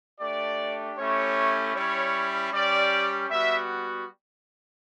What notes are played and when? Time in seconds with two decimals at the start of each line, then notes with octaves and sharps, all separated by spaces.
0.20 A3 D4 G4 D5
0.98 A3 C#4 E4 G4 C#5
1.75 G3 C#4 E4 C#5
2.52 G3 C#4 G4 D5
3.30 G3 B3 F#4 E5